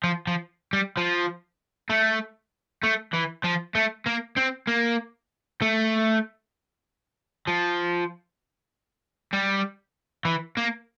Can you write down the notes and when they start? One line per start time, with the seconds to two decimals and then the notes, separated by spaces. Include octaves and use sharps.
0.04 F3
0.27 F3
0.73 G3
0.97 F3
1.90 A3
2.83 A3
3.13 E3
3.44 F3
3.75 A3
4.07 A#3
4.38 C4
4.68 A#3
5.62 A3
7.48 F3
9.33 G3
10.25 E3
10.57 A#3